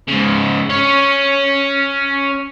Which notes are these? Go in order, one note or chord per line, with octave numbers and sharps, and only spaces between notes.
G#2 C#3
C#4 C#5